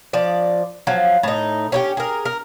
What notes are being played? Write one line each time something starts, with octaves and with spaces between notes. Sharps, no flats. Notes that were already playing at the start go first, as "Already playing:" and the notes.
F3 D5
F3 F#3
A2 D#4
C#4 D#4 G4
G#4 A#4
A#4